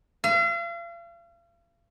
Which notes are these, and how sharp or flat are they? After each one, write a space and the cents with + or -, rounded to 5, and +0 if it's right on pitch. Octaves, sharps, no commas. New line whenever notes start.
F5 -40